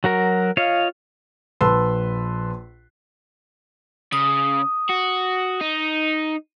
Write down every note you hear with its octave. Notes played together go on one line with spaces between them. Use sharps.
F#3 F#4 A#4
F4 C#5 D#5 F5
A#1 B4 A5 C6 E6
C#3 D#6
F#4
D#4